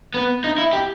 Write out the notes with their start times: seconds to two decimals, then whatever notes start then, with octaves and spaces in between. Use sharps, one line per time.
0.14 B3
0.44 D#4
0.58 E4
0.73 G4